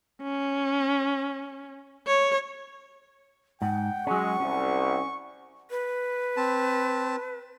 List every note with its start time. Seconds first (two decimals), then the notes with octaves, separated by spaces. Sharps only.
0.22 C#4
2.07 C#5
3.62 G#2 F#5 G5
4.07 F#3 G#3 C#4 C#6
4.40 C2 C#4
5.70 B4
6.37 C4 A5